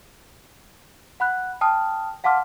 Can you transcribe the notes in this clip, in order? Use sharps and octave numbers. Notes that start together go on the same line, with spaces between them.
F#5 B5 F#6
G5 A5 D#6 F6
F5 F#5 A5 C6 D6 F6